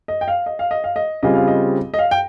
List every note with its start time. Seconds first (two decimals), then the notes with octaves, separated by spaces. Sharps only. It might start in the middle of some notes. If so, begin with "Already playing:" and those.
0.08 D#5
0.21 G5
0.28 F5
0.46 D#5
0.59 F5
0.71 D#5
0.84 F5
0.96 D#5
1.23 C#3 G3 C4 F4 G#4 D#5
1.35 F5
1.47 D#5
1.94 D#5
1.99 F5
2.11 G5